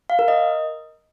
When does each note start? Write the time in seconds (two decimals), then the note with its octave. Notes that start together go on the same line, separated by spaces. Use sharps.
0.10 F5
0.19 A#4
0.28 D#5